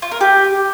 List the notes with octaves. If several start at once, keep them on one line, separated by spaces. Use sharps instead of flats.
F4
A#4
G4